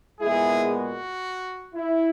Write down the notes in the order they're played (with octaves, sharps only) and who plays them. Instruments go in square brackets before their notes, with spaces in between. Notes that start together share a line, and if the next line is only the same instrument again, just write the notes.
[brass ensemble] A#2 G#3 B3 E4 G#4
F#4
E4